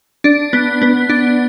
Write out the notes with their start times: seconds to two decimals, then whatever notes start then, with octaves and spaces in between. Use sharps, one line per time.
0.24 D4
0.53 B3
0.82 B3
1.09 D4